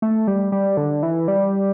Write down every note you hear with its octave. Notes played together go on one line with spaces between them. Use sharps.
A3
G3
G3
D3
E3
G3